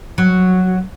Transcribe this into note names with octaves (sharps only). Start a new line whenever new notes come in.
F#3